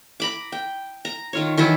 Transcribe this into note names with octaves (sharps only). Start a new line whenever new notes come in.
A#5 B5 D6
G5
A#5
D#3 F4 C#5
D#3 E3 F#3 E4